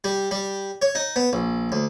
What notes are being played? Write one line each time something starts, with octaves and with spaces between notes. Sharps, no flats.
G3
G3
C#5
D#4
B3
A#1
D2